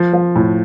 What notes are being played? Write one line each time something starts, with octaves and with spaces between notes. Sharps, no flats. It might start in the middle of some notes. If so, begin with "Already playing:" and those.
Already playing: F3
F3
A2